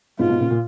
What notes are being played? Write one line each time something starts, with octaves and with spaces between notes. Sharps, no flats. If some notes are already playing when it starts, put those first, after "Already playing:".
G#2 B2 F4
G#2 B2
A#2 C#3
A#2